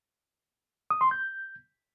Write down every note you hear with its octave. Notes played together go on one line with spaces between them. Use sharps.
D#6
C6
G6